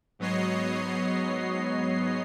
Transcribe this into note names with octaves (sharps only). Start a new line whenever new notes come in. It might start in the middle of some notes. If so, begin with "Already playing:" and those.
G#2 F#3 B3 C#5 D#5 C7